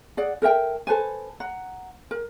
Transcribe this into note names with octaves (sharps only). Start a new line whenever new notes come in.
G#4 D5 F#5
A4 A#4 E5 G5
A4 B4 C5 G#5
F#5 A#5
A#4